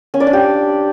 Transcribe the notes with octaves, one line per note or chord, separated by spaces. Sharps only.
C#4
D5
D4
G4